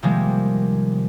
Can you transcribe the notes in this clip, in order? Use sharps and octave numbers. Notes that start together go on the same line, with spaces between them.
C3 D#3 F3 G3 G#3 A#3